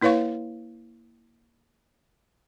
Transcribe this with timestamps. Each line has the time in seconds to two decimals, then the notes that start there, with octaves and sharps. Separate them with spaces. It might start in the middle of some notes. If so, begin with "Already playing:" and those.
0.02 A#3 E4 B4 C#5 F5 C#6